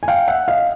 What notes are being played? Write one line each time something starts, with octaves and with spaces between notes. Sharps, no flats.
G#5
F5 G5
E5 F#5
D#5 F5